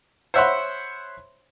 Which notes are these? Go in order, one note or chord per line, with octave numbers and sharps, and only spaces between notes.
C5 C#5 E5 F#5 B5 C6